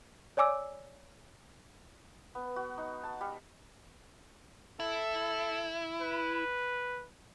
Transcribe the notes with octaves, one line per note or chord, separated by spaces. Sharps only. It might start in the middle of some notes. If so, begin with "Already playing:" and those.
C#5 D5 G#5 D6 E6
B3
F#4
D#4
A5
G3
E4 A4
B4